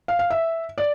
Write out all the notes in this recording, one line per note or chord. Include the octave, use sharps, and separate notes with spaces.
F5
F5
E5
D5